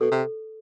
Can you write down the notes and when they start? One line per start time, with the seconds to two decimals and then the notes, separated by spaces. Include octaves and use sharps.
0.01 B2 A4
0.12 C3